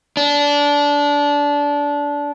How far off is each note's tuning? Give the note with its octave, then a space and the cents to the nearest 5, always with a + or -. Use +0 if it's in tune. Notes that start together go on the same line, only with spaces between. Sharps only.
D4 -20